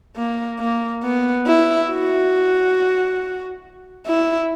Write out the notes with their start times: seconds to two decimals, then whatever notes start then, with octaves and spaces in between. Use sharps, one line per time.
0.16 A#3
0.60 A#3
1.04 B3
1.46 E4
1.90 F#4
4.07 E4